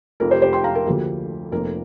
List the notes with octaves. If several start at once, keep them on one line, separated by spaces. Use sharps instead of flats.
F1 F2 F3 A#4
G4 C5
G4 C5
G5 C6
F5 A#5
A#4
D2 D3 F3 A#3 G4
F1 F2 F3 A#3 A#4